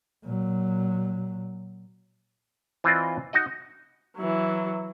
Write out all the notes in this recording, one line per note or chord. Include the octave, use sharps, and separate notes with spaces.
A#2 F#3
E3 C4 F4 C5 D5 D#5
D#4 F#4 D#5
E3 F#3